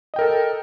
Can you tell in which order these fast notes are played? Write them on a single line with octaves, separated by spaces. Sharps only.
D#5 G5 A#4 A4